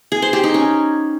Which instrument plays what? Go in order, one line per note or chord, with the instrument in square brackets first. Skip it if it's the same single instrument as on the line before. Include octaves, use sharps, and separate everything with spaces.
[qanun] G#4
C5
G4
D#4
C#4